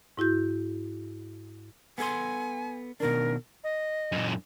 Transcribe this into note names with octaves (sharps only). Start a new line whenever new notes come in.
G#2 E4 F#4 G6
B3 A4 G#5 C6
B2 D#3 D4 A#4
D#5
F#2 A#2